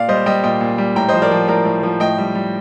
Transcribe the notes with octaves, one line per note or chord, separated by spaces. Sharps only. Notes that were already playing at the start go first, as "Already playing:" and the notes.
Already playing: A#2 D5 F5
G3 C5 D#5
G3 D#5 G5
A#2 D#5 G5
A#2
G3
A2 G5 A#5
C5 D#5
F3
A#4 D5
F3
A2 A#4 D5
A2
F3
A2 D#5 G5
G3
G3